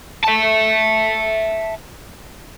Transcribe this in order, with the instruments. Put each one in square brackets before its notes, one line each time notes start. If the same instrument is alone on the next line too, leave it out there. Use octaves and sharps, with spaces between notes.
[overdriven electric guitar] E5 A5